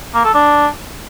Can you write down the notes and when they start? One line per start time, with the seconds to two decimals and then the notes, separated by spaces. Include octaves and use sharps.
0.14 A#3
0.24 A4
0.34 D4